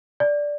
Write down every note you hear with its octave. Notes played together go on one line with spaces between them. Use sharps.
D5